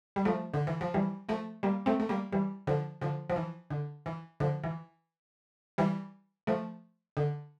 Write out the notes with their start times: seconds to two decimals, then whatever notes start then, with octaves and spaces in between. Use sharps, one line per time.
0.16 G3
0.25 F3 A3
0.54 D3
0.67 E3
0.81 F3
0.94 E3 G3
1.29 F3 A3
1.63 G3 A#3
1.86 A3 C4
2.00 A3
2.09 G3 A#3
2.32 E3 G3
2.67 D3 F3
3.01 D3 F3
3.30 F3
3.36 E3
3.70 D3
4.06 E3
4.40 D3 F3
4.64 E3
5.78 E3 G3
6.47 F3 A3
7.17 D3